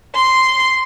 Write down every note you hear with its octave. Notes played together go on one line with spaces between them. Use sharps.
C6